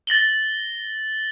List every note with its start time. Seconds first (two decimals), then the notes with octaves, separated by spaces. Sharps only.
0.07 A6 A#6 F#7 G7